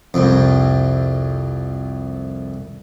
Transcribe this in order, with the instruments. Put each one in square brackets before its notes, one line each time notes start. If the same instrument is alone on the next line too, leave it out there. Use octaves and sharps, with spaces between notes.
[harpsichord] C2 F2